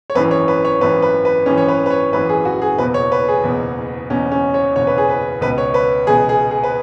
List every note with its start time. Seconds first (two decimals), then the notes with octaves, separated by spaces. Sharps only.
0.10 C#5
0.15 G#1 F#2 E3 B4
0.31 C#5
0.48 B4
0.65 C#5
0.81 G#1 F#2 E3 B4
1.02 B4
1.25 B4
1.46 G#1 F#2 E3 C#4
1.57 C#5
1.68 B4
1.86 B4
1.90 C#5
2.12 G#1 F#2 E3 B4
2.29 G#4
2.45 F#4
2.62 G#4
2.78 F#1 E2 B2 B4
2.94 C#5
3.12 B4
3.28 G#4
3.44 F#1 E2 B2
4.10 F#1 E2 B2 C#4
4.31 C#4
4.54 C#5
4.76 F#1 E2 B2 C#5
4.87 B4
4.98 G#4
5.09 B4
5.41 C#2 B4
5.45 B2
5.58 C#5
5.74 B4
6.07 C#2 B2 G#4
6.29 G#4
6.51 G#4
6.64 B4